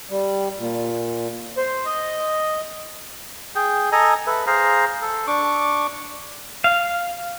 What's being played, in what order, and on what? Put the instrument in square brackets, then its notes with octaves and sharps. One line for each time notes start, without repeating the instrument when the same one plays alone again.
[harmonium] G3
A#2
C5
D#5
[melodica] G#4 G5
A4 D#5 G#5 A#5
A4 B4 E5
G#4 C5 F5 A#5
A4
D4 C#6 D6
[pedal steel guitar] F5